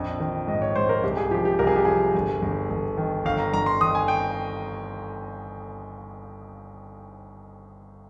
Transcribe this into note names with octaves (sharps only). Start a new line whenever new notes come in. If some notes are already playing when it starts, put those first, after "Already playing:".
Already playing: A#1 F2 D#5
D#3
G#2 D#5
C#5
G#2 C5
A#4
C2 G4
G#4
F3 G4
G4
C2 A#4
G#4
G4
F3 G#4
G1
G1
G1
D#3
G1 F5
A#5
G1 A#5
C6
D#3 D#6
G#5
G5